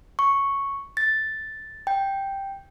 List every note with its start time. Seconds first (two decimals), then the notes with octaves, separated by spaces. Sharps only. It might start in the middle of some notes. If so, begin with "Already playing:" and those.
0.19 C#6
0.97 A6
1.87 G5